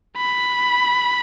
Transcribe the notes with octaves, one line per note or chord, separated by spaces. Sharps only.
B5